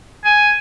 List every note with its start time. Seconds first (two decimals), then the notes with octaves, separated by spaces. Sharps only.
0.25 G#5